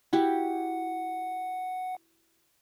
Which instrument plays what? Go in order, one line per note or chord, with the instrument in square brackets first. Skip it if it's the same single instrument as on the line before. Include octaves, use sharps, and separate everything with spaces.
[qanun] E4 F#4 G4 [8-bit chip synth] F#5